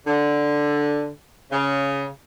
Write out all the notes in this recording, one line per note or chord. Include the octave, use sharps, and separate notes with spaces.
D3
C#3